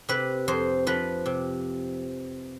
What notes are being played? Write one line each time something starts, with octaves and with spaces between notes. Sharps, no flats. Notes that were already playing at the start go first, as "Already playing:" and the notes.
C3 B4
F2 C5
F3 B4
C3